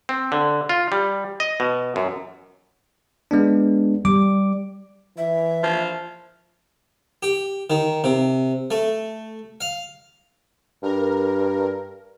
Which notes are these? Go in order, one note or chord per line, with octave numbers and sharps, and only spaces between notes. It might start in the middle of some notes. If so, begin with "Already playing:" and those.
C4
D3
F4
G3
D#5
B2
F#2
G#3 B3 D4
G3 D6
E3 E5
F3
G4
D#3
C3
A3
F5
G2 A#4